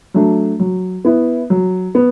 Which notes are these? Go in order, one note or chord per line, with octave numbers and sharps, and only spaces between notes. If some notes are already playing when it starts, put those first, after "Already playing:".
F#3 A3 D4
F#3
B3 E4
F#3
B3